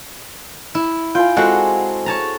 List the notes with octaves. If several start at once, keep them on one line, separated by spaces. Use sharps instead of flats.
E4
F4 F5 G5 G#5
G#3 C4 F#4 A4 F5 F#5
C#5 A5 A#5